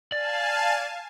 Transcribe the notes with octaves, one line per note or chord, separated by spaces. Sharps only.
D5 F5 G#5 A5